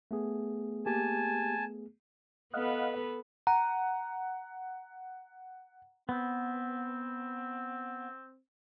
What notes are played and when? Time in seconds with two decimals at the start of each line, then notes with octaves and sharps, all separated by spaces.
0.11 A3 B3 G#4
0.86 A#3 G4 G#5 A5
2.54 B3 A4 B4 D#5 F5 F#5
3.47 F#5 A#5
6.09 B3 C4